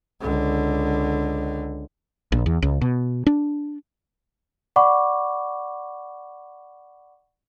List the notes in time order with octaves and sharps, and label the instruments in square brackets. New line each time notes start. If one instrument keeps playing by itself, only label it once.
[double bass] C#2 D3
[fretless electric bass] A#1
E2
C#2
B2
D4
[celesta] D5 F#5 B5 C#6 D6